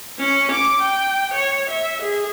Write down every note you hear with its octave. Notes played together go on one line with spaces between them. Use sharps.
C#4
D6
G5
C#5
E5
G#4